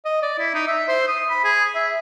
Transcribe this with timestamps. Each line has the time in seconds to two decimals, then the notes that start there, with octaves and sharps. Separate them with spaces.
0.05 D#5
0.22 D5
0.39 E4
0.54 D#4
0.68 E5
0.88 C5
1.08 D#6
1.30 B5
1.44 G#4
1.75 E5